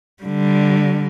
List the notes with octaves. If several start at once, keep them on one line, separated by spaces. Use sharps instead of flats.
D3 G3